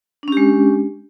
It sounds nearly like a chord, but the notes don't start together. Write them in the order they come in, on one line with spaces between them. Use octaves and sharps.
D4 C#4 G4 G#3